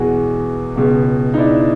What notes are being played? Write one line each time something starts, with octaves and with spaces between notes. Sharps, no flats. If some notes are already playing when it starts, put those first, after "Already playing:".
Already playing: E2 B2 G#3 F#4 G#4
C#2 B2 G#3
D#4
D4 E4